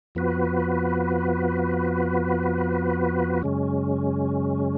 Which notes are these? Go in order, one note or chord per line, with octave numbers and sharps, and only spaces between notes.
F2 F3 B3 F#4 B4
F#2 C#3 G#3 C#4